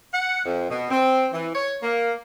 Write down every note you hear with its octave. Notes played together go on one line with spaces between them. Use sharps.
F#5
F2
B2
C4
E3
C#5
A#3